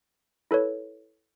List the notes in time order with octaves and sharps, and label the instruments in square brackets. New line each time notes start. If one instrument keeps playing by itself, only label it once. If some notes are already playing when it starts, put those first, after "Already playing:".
[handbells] E4 A4 B4 C#5